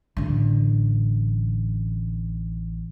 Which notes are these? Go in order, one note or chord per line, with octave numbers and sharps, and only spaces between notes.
A1 D3